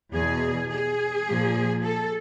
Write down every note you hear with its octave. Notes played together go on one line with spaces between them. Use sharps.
E2 B2 G#4
G#4
A#2 F3
A4